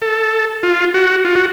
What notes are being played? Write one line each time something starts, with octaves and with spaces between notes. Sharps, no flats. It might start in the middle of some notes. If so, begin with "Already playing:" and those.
A4
F4
F#4
F4
F#4